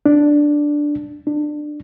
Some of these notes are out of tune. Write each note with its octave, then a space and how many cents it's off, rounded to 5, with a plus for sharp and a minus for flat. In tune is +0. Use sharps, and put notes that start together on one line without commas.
D4 +0
D4 +20